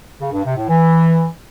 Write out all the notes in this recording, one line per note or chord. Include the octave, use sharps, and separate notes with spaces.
C#3
G2
C3
A2
E3